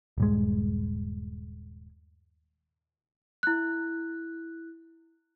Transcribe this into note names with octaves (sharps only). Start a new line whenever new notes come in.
D#1 G2 G#3
E4 F#6